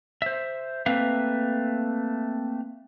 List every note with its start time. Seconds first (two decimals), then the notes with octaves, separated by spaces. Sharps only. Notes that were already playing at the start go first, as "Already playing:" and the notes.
0.22 C5 E5
0.86 A3 A#3 C4 B4 E5 F5